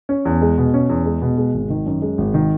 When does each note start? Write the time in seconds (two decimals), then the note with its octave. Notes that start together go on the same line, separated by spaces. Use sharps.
0.09 C#4
0.25 E2
0.42 G#3
0.58 B2
0.74 C#4
0.89 E2
1.06 G#3
1.22 B2
1.38 G#3
1.54 G#1
1.70 D#3
1.86 F#2
2.02 G#3
2.18 G#1
2.34 D#3